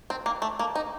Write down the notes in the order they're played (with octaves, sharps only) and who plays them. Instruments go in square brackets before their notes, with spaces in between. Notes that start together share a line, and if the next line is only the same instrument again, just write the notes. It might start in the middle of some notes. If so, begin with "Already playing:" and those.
[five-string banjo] C4
A#3
A3
A#3
D#4